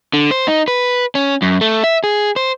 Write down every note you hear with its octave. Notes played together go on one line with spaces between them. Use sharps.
D3
C5
D#4
B4
C#4
F#2
A3
E5
G#4
C5